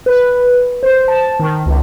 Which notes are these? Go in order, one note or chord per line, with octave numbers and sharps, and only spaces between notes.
B4
C5
A5
D#3
C#2